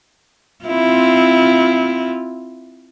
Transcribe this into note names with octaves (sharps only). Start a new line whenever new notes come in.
C4 E4 F4